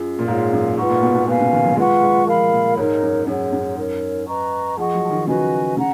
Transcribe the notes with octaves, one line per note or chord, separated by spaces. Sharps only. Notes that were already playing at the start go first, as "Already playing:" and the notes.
Already playing: F#2 C#4 F4 G#4
A#2
G#2 F4 G#4 C#5 F5
F#2
G#2 F4 B4 F#5 C#6
A#2
B2
B2
B2 B4 F5 G#5
C#3
D#3
F#3
G#3 F4 B4 F#5 C#6
G#3
F3 A#4 F5 B5
A#2
G#2 D#4 A#4 C#5
F#2
F#2 G#4 C#5 F#5
F#2
D#4 A#4 C#5
B4 D#5 A#5 C#6
F3 G#4 D#5 F#5 C#6
F#3
F3
D#3
C#3 F#4 B4 D#5 G#5
C#3 F#5 A#5